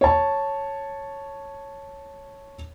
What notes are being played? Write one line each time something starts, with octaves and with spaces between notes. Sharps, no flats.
C#5 A5